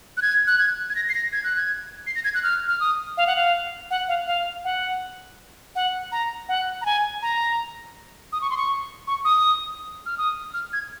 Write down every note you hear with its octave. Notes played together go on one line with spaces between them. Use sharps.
F#6
G#6
F#6
G#6
G#6
A#6
C7
A#6
G#6
F#6
G#6
C7
A#6
G#6
F#6
F6
F6
D#6
F5
F#5
F5
F#5
F5
F5
F#5
F#5
A#5
F#5
A#5
G#5
A#5
D#6
C#6
C6
C#6
C#6
D#6
F6
D#6
F6
G#6